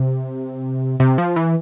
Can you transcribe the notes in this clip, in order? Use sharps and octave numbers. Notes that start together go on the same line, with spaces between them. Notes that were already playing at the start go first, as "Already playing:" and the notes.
Already playing: C3
C3
F3
E3